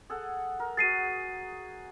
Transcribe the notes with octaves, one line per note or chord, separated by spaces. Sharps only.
G#4 A4 F#5
A#4
F#4 G#4 A6 C7 D#7